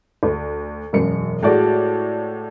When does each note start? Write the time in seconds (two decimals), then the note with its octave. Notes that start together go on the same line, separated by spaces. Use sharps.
0.23 D2
0.93 E1 F#2 C#7
1.43 A2 G#3 F#4 D5